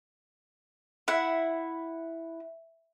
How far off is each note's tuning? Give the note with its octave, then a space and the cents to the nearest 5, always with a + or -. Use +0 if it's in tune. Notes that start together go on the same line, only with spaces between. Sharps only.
E4 +0 F#5 +0